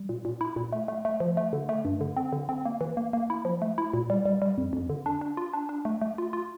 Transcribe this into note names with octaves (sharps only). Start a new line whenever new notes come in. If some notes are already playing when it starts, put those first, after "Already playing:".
Already playing: G3
A#2
A#2
E4
A#2
A3
A3
A3
F3
A3
D3
A3
G2
D3
C4
D3
C4
A#3
E3
A#3
A#3
E4
F3
A3
E4
A#2
G3
G3
G3
F2
F2
D3
D4
D4
F4
D4
D4
A3
A3
F4
F4